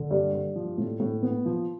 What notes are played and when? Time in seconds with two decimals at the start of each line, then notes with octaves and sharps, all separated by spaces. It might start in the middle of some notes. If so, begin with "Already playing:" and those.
Already playing: D3
0.11 G2
0.33 G2
0.56 F3
0.78 A2
1.00 A2
1.23 B3
1.46 F3